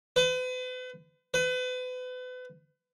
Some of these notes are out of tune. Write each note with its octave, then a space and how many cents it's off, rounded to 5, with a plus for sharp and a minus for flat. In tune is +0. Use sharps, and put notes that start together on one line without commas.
B4 +40
B4 +35